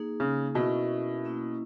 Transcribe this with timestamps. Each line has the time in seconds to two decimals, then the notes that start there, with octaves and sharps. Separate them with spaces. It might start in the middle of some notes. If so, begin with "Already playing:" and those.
Already playing: A#3 D#4 G#4
0.20 C#3
0.55 B2 C#4 E4 A#4 E5
1.25 A#3 C#4 E4